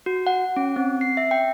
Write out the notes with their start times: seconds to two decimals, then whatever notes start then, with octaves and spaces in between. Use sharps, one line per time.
0.06 F#4
0.27 F#5
0.56 C#4
0.76 C4
1.01 C7
1.17 E5
1.31 G5